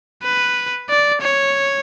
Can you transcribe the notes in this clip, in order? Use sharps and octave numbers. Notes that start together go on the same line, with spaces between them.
B4
D5
C#5